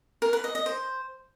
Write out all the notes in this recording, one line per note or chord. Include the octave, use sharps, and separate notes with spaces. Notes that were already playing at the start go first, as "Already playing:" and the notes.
A#4
B4
D#5
D#5
C5